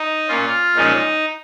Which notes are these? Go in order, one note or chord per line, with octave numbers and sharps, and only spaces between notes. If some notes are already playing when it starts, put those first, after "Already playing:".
Already playing: D#4
A#2 A#3 C#4 F4
A#2 F3 G#3 C#4 D#4